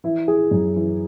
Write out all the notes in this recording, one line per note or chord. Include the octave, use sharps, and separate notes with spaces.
E3 E4
E3 G#4
F#2
E3